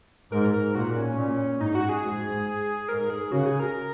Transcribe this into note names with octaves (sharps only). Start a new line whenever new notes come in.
G#2 A#4
A#4
A#2 F#4
C#4
A#2
G#2 D#4
F#4
G#4
G#2
G#2 A#4
G#4
C#3 F#4
G#4
A#4